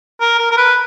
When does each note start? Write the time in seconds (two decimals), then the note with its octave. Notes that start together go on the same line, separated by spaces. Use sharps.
0.21 A#4
0.39 A#4
0.51 A#4
0.57 B4